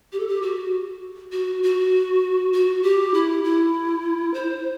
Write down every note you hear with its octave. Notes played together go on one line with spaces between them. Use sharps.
G4
A4
G4
F#4
F#4
F#4
F#4
G4
E4
E4
C5